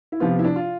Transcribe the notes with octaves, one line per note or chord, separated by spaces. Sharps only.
E4
C3 F3 B3 F4
E4
D4
F4